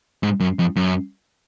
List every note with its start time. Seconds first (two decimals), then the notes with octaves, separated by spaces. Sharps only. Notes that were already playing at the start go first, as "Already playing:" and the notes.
0.23 G#2
0.40 F#2
0.59 F2
0.76 F#2